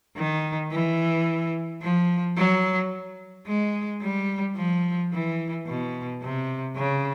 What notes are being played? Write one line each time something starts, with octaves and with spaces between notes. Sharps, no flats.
D#3
E3
F3
F#3
G#3
G3
F3
E3
B2
C3
C#3